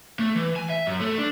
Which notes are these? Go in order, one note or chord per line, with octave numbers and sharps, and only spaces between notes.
A3
E3
G#5
E5
F#2
A3
D4